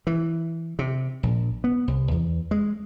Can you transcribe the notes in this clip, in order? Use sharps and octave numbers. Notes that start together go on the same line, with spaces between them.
E3
C3
A#1
B3
C2
E2
G#3